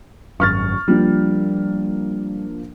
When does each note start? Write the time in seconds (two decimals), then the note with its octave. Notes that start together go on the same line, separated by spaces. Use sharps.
0.40 G#1 F#2 C#6 F6 A6
0.88 F3 G3 A#3 D4